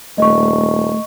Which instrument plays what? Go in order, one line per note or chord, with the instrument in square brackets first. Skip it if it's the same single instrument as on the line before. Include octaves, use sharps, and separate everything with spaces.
[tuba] D#1 [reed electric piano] A3 [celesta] D#5 C#6